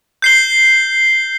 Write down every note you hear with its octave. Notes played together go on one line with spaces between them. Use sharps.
G6 C7 G7